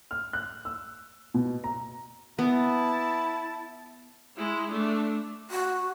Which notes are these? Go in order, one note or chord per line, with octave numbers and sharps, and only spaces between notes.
F6
F#6
E6
B2
A#5
B3 E4 A5
G#3 E4
A3 D4
F#4